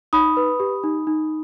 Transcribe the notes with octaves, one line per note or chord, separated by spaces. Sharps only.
D#4 B5 D#6
B4
G4
D#4
D#4